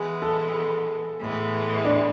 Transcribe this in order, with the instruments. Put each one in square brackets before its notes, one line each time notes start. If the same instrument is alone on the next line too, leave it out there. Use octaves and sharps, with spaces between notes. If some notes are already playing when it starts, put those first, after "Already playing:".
Already playing: [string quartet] E3 G#3 B3 [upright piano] G#4
[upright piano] A4
[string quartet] A2 E3 G#3 B3
[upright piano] D4